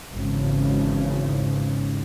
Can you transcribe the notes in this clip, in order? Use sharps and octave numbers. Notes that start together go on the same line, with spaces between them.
G#1 E2 C#3